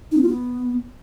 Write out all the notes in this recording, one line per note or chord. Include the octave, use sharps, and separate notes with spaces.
D#4
C4
F4
B3